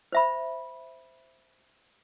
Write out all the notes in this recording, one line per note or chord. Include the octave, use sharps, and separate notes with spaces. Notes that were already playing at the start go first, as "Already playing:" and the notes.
C5 E5 B5